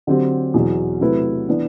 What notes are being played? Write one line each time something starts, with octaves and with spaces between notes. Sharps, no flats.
D3 F#3 C4 G4
E2 B2 F#3
C3 F#3 A3 E4 B4
E3 B3 D4